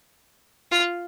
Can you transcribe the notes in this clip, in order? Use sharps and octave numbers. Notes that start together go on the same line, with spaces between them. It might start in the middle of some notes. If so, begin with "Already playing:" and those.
F4